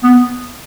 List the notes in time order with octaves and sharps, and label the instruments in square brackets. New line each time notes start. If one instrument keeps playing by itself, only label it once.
[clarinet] B3